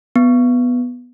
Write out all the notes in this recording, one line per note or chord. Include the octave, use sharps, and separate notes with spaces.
B3